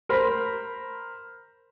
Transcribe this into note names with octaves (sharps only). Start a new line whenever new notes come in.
A#4 C5 A#5 B5